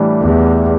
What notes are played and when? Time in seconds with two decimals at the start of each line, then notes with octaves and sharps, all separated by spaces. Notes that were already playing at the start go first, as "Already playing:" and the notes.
Already playing: A2 E3 G3 D4
0.22 E2